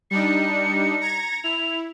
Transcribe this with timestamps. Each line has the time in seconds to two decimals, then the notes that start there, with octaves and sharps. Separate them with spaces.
0.11 G3 D4 D#4 C#7
1.01 A#5 G#6 A#6
1.44 E4 F7